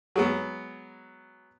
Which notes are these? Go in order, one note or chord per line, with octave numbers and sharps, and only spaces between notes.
F#3 G#3 B3